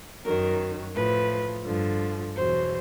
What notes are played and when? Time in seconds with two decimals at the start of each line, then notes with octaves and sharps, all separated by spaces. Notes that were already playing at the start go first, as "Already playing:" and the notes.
0.25 F#2 D#3 F#3 A#4
0.95 A2 F3 B4
1.65 G2 D3 F3
2.35 E2 B2 F#3 C5